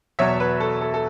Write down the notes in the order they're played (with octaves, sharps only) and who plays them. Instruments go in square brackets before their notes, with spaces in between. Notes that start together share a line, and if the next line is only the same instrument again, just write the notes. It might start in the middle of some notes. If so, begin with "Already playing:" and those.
[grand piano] E2 B2 F#3 C#5 E5
B4
A4
A4
A4